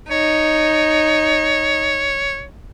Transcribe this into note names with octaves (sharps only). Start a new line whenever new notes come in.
D#4 C#5